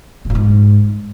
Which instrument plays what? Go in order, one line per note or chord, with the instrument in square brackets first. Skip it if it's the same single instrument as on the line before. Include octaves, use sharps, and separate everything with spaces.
[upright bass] C#3
A#2
G#2